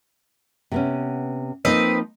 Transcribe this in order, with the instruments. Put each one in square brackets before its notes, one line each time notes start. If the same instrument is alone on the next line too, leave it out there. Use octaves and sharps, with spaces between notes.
[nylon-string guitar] C3 B3 C#4
[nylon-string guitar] F3 A#3 D#4 [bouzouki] C4 B4 D#5